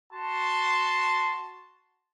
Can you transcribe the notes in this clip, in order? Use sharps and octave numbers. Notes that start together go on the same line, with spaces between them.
F#4 A5 C6